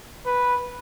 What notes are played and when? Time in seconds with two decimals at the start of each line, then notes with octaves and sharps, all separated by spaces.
0.26 B4